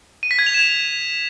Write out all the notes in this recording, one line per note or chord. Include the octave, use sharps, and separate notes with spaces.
D#7
B6
G#6
F7
E7